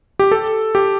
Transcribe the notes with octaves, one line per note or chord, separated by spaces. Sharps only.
G4
A4
G4